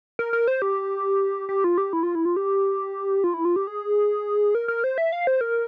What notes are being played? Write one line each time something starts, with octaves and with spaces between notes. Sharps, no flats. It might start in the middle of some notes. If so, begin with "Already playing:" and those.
A#4
A#4
C5
G4
G4
F4
G4
E4
F4
E4
F4
G4
F4
E4
F4
G4
G#4
A#4
A#4
C5
E5
F5
C5
A#4